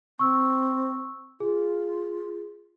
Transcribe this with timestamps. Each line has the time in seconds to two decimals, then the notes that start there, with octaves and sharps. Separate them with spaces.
0.19 C4 C#6 E6
1.40 F4 G#4